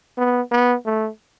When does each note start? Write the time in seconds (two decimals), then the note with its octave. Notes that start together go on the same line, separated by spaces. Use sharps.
0.18 B3
0.51 B3
0.85 A3